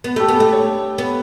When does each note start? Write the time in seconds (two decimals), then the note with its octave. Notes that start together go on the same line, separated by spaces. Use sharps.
0.04 B3
0.16 A3 G4
0.28 B3
0.36 A3 A4
0.52 C#5
0.98 B3